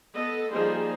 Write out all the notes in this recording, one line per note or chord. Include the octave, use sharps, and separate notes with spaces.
B3 A4 D#5
F3 G3 A#3 D#4 G#4 C5